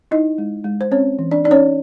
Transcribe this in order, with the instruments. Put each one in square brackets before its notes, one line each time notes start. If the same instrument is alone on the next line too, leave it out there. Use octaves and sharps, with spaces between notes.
[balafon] D#4 E4 D#5
G#3
G#3
C5
C4 C#4 C#5
E3
D4 D5
D#4 D5
C#4 C#5